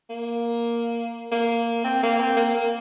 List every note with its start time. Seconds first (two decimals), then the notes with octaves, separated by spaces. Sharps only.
0.10 A#3
1.32 A#3
1.84 C4
2.03 A#3
2.20 C4
2.37 A#3
2.55 A#3